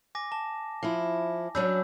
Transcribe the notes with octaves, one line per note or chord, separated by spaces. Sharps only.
G#5 D6 A#6
A5
F3 E4
F#3 C#4 D4 B5 E6 G6